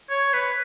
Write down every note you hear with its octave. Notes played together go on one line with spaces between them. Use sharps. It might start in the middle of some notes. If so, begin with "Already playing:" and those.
C#5
B4